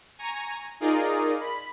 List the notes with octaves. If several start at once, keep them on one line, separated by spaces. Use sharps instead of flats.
G#5 A#5 C#6
D#4 F4 G#4 A#4 D5 D#5
B5